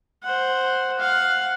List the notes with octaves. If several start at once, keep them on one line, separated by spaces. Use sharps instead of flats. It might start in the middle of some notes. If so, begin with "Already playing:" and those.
C5 F#5
F5 F#5